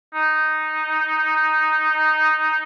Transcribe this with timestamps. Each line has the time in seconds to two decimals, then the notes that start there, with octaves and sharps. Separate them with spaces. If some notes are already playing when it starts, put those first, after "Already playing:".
0.15 D#4